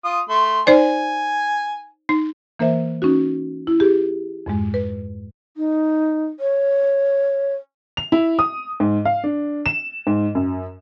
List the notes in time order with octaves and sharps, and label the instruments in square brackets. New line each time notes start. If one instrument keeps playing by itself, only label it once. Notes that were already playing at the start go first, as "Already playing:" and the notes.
[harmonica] F4 D#6
A3 C6
[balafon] D#4 C5 D5 [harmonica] G#5
[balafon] D#4
[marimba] E3 A#3 A#4 C5 E5
C#4 D#4 F#4
E4
G4 G#4
F2 G#2 G#3
B4
[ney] D#4
C#5
[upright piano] F7
E4
D#6
G#2
F5
D4
E7
G#2
F#2